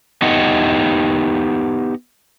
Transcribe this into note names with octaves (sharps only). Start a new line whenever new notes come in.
B3 D#4 G4 D#5 F#5